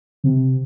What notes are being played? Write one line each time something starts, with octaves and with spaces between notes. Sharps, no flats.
C3